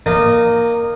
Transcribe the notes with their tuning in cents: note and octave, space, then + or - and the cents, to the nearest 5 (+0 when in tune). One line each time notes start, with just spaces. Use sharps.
A#3 +0 D#4 -20